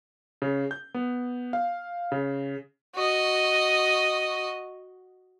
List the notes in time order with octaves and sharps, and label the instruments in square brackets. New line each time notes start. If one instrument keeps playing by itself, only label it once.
[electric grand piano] C#3
G6
B3
F5
C#3
[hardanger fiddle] F#4 D#5